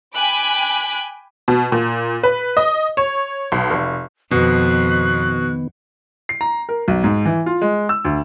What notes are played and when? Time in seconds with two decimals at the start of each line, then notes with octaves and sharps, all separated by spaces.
0.15 G5 G#5 B5 D6 F#6
1.48 B2
1.72 A#2
2.23 B4
2.57 D#5
2.97 C#5
3.52 B1
3.70 F1
4.31 F2 B2 D#3 B3 F#6
6.29 C7
6.41 A#5
6.69 A#4
6.88 B1
7.04 G#2
7.25 E3
7.46 F4
7.62 G#3
7.89 E6
8.05 D2